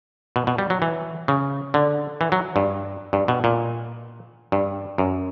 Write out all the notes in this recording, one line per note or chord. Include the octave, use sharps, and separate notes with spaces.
B2
B2
G3
F#3
E3
C#3
D3
E3
F#3
G2
G2
B2
A#2
G2
F#2